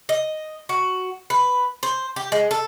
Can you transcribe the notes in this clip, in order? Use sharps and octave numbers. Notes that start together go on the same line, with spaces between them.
D#5
F#4
B4
C5
G4
G#3
A4